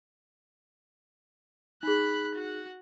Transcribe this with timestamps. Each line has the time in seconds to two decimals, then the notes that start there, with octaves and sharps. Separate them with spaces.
1.83 D#4 G#4 B5 F#6
2.35 F#4 F#5